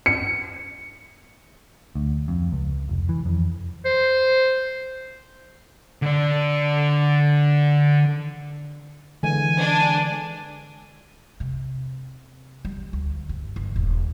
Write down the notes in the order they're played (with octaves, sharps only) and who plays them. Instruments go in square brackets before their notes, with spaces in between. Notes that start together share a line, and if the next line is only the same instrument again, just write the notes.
[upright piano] C#7
[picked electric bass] D2
F2
C#2
F1
E3
F2
[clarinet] C5
[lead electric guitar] D3 D5
[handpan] D3 E3 G#3 [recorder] G#5
[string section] D4
[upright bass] C3
G3
D2
G2
G1
D#1